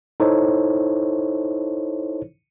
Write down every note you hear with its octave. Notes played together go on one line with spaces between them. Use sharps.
D#4 E4 A4 C5 C#5